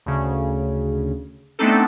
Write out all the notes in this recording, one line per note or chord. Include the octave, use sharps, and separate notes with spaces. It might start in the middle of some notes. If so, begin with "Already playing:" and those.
D2 C#3
A3 B3 C4 D4 D#4 A4